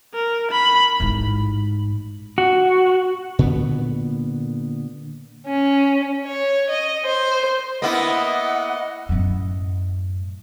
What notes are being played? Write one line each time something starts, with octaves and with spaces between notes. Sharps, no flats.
A#4
B5
A1 G#2
F#4
A#2 D3 B3
C#4
C#5
D#5
C5
A#3 B3 E4 D#5 F#5
F#2 A2